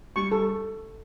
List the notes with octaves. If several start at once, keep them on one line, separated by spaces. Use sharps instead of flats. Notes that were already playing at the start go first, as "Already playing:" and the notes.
G3 C#6
A4